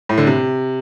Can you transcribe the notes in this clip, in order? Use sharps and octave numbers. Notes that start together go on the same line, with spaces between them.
A2
D3
C3